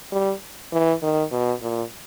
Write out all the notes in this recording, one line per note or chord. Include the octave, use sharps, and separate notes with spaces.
G3
E3
D#3
B2
A#2